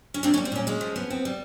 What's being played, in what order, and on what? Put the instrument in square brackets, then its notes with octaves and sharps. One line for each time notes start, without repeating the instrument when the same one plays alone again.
[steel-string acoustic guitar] C#4
A#3 C4 D4
C#4 D#4
G3
C4
A#2 C#4
G#3 C#4
F3
B3
C4
G3